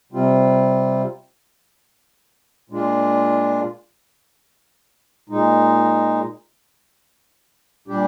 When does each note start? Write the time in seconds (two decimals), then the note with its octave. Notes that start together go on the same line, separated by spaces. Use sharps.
0.12 C3 G3 C4 F4
2.70 A#2 G#3 D4 F4
5.29 A#2 G#3 D#4
7.88 A#2 G3 D4 G4